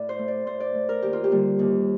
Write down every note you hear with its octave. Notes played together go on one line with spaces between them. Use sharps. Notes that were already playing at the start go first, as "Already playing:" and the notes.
Already playing: A2 D5
C5
A3
D5
A2 C5
D5
A3
A#4
D#2 G4
F4
G4
D3 G3 A#3
D#2